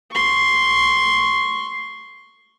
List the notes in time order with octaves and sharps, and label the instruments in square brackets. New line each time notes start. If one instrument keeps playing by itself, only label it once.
[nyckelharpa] C6 C#6